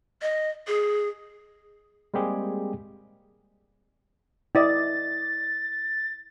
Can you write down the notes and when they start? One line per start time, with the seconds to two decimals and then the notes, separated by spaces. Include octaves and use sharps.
0.22 D#5
0.67 G#4
2.14 G3 G#3 A#3 C4 G4 G#4
4.55 E4 D5 D#5 A6